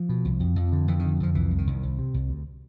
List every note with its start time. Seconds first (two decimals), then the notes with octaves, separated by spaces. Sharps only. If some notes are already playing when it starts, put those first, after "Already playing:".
Already playing: F3
0.09 B2
0.25 C2
0.40 F2
0.56 F2
0.72 D3
0.88 F2 E3
0.99 D3 D#3
1.20 F2 F3
1.35 C2 E3
1.51 C2
1.58 D#3
1.67 C2
1.83 C2
1.99 C3
2.14 C2
2.29 D2